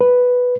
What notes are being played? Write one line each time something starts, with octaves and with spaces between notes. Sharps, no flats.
B4